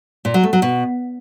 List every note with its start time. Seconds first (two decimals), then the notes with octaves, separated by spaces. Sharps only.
0.25 A#2
0.34 F#3
0.43 A3
0.53 F#3
0.62 B2